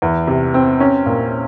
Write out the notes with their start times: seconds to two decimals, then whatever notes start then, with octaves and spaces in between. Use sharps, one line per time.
0.02 E2
0.27 C3
0.54 C4
0.80 C#4
1.06 A#2